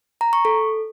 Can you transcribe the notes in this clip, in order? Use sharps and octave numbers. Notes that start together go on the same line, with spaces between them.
A#5
C#6
A4